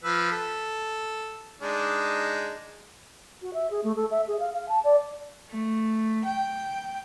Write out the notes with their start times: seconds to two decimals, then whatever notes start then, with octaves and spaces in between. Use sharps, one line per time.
0.04 F3 B4 E6
0.31 A4
1.62 G#3 D4 D#4
3.42 F#4
3.53 E5
3.70 G#4
3.83 A3
3.95 A4
4.11 E5
4.27 G#4
4.39 F5
4.53 F5
4.68 A5
4.84 D5
5.50 A3
6.25 G5